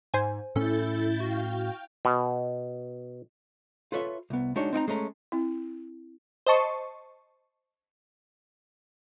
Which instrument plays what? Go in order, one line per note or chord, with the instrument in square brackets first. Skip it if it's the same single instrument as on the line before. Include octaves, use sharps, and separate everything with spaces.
[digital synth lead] G#2 [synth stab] C5 G#5
[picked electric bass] A2 C#4 [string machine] E4 G6 A6 [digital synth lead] A4
[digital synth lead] F#4 [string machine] F5 G5
[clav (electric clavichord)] B2
[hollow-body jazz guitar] F4 A4 B4 C#5 E5
C2 B3
G#3 D4 D#4 F#4 C#5
C4 D#4 G5 A#5
G#3 A3 C#4 A#5
[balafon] C4 E4
[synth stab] C5 D#5 A5 C#6